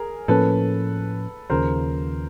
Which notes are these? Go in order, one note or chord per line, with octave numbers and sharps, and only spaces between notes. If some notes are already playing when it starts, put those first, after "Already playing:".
Already playing: G#4 A#4
A2 F3 A#3 C#4 A4 B4
D#2 C#3 F3 A#4 C5